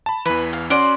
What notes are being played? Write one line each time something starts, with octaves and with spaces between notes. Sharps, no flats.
A5 B5
E2 E3 B4
F5
C#4 F#4 D5 C6